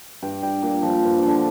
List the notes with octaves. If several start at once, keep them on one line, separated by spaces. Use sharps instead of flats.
G2 G4
G3 G4
A#2
F3
G2
D3 F3